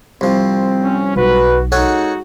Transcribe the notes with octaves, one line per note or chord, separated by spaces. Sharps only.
C2 F3 C4
C#4
B1 F#4 B4
G#3 D#4 F#4 A4 C#5 F#5